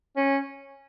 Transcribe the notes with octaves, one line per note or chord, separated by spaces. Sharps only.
C#4